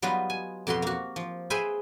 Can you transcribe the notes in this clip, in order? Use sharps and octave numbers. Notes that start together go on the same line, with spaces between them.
F#3 G3 B3 D#4 F4 B4
G#5
F2 B2 F#4 G4 C6
A#3 F#4
F3
G#4 B4 C5 E5 G5 G#5